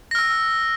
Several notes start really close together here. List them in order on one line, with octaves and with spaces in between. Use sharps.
A#6 F6 E6